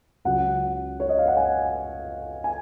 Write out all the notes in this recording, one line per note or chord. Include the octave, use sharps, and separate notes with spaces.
C#2 C#3 F#3 C#4 F#5
C#5
D#5
F5
F#5
G#5
G#5